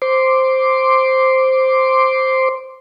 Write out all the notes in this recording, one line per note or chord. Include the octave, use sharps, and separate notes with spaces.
C5 C6 D6